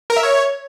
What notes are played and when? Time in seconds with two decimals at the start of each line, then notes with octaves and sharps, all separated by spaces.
0.10 A#4
0.17 E5
0.23 C#5